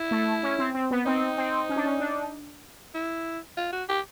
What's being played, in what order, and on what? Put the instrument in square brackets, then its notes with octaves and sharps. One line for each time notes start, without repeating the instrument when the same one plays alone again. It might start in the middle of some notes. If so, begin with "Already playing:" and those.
Already playing: [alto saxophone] E4
[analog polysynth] A3
C#4
C4
C4
B3
[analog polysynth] C4 [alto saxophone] D#4
[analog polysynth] C4
C#4
D4
C#4
D4
[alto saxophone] E4
F4
F#4
G4